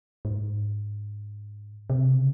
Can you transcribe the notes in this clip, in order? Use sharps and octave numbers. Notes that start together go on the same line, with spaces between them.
G#2
C3
C#3